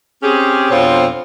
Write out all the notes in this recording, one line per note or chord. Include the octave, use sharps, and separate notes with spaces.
C4 C#4 G4 G#4
F2 B2 F3 C4 D4 C#5